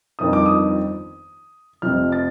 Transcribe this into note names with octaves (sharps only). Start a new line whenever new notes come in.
G1 F2 D#3 D#6
D6
D#6
F1 F2 C3 F3 C4 F6
A6